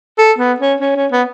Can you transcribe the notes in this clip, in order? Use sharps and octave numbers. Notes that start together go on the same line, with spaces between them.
A4
B3
C#4
C#4
C#4
B3